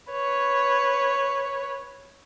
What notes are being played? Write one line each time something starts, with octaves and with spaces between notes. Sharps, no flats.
B4 C#5